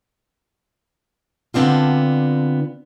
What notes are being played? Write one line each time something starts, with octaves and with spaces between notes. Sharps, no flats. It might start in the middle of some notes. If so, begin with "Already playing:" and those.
D3 B3 C4 D4 F4